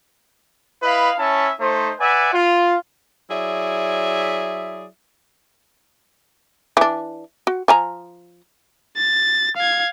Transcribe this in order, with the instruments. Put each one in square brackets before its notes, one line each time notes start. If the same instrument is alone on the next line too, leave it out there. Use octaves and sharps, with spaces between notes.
[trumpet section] E4 B4 D#5 F5 B5
C#4 E4 C#5 E5 A5
A3 D#4 C5
B4 D5 E5 F#5 G#5
F4
[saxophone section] F#3 E4 G#4 D5 E5
[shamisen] E3 D4
F#4
F3 G#5 A#5
[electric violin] A6
F5 G#6